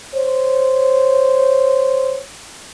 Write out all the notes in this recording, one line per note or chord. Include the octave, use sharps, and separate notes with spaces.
C5 C#5